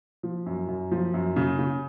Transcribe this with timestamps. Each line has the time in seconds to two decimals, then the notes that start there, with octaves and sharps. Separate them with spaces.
0.23 F3
0.46 F#2
0.68 F#2
0.91 F3
1.14 F#2
1.36 C#3
1.59 C#3